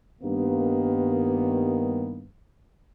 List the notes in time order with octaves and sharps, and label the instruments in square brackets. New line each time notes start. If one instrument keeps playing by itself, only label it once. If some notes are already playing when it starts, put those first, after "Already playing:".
[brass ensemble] G2 D#3 A#3 B3